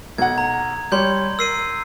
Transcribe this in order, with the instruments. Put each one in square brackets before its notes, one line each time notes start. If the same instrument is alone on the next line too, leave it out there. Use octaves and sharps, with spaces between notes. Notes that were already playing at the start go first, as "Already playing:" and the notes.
[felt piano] B1 F#5 [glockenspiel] G#6
[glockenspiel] A#5
[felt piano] G3 C#5 [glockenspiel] C6 G6
[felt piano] A#4 [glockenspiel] E6 C7 D#7